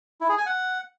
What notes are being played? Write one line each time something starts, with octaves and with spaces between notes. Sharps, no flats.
E4
G#4
G#5
F#5